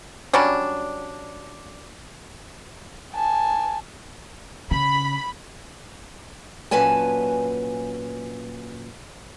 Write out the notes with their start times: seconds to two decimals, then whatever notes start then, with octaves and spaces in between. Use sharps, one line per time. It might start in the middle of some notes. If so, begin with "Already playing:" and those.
0.33 F#3 G3 C#4 D4
3.14 G#5 A5
4.71 C#3 B5
6.71 A#2 F#3 C#4 B4 G#5 A5